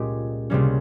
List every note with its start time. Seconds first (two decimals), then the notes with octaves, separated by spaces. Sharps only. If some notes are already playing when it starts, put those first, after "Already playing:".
Already playing: C#2 A#2 G#3 C#4 G4
0.50 C#2 C3 G3 A#3 C#4